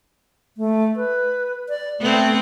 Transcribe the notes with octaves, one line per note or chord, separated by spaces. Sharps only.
A3
B4
D5
A3 B3 C4